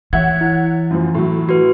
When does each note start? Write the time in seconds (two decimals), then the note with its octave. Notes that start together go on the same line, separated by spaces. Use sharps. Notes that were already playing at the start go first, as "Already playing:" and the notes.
0.13 E3 C#5 E5 F#5 G#6
0.41 E4
0.90 F#2 F3
1.15 A2 F#3
1.49 F#4 B4